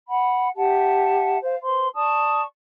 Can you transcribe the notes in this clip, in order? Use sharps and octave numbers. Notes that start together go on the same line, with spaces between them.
F#5 B5
G4 E5 F#5 A5
C5 F5
B4 C5 C6
D5 A5 C#6 D#6